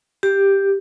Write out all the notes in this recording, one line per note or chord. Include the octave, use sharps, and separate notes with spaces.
G4